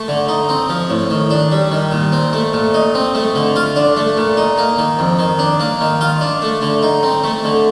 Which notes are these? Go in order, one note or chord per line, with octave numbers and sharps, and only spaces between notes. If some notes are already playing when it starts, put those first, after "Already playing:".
Already playing: A3
D3
D#4
C4
F3
A2
D#3
D4
G3
D#3
A#2
C4
A3
A#2
D#4
C4
A3
D3
F4
D4
A3
A#2
D#4
A#3
D#3
F2
D#3
D4
A#3
D#3
F4
D4
A3
D3
D#4
C4
A3
D3